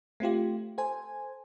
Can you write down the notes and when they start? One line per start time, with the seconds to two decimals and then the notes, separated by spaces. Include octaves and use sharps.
0.20 A3 C4 F4 G4
0.78 A4 C5 G#5